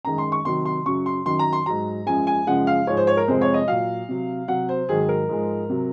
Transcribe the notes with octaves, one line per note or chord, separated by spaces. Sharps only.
F#2 D#3 G#3 A#5
C6
C#6
C3 D#3 F#3 C6
C6
F#2 C#3 F#3 C#6
C6
F#2 D#3 F#3 C6
A#5
C6
G#2 F#3 A#5
F#2 F3 G#3 G#5
G#5
F#2 C#3 F3 G#3 F#5
F5
G#2 F3 G#3 C#5
C5
C#5
A#4
F2 C3 F3 G#3 C5
C#5
D#5
A#2 F#3 F5
C3 F#3
C3 F#3 F#5
C5
G#2 D#3 F#3 G#4
A#4
G#2 F3 G#3
C3 F#3